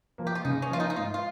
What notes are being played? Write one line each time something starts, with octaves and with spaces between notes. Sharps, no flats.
F3 A#3
G4
F4
C#3 D#4
C#4
F3 A#3 F4
D#4
D#4
G#2 F4
F4